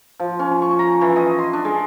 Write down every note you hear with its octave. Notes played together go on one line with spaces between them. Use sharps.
F3
C#4
C#6
A#5
E3
D#5
C6
D4
G#3